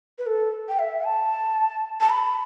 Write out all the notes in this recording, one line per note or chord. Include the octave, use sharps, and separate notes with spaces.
B4
A4
G5
E5
A5
A5
B5